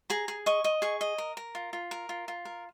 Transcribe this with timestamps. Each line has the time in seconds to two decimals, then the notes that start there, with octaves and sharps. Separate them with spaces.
0.10 G#4 A#5
0.28 G#4
0.46 D#5 C#6
0.64 D#5
0.82 G#4 C#6
1.01 D#5
1.18 A#4
1.37 A#4
1.55 F4
1.73 F4
1.91 A#4
2.09 F4
2.28 F4
2.45 A#4